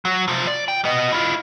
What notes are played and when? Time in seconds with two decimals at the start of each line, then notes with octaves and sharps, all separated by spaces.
0.05 F#3
0.28 C3 F3
0.47 D5
0.68 G5
0.85 B3 D#5
1.12 E4 F4